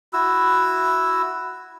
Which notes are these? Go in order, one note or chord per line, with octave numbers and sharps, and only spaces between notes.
E4 F#4 E6